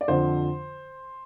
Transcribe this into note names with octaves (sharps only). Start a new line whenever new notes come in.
D5
F2 D3 F3 C5